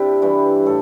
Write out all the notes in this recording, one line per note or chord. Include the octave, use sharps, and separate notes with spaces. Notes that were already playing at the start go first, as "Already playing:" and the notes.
Already playing: C3 D4 E4 G4
G2 E3 G3
A2 A4